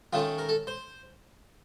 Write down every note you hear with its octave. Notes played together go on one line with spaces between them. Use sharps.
D#3 A3 C#4 F4
A#4
A4
C5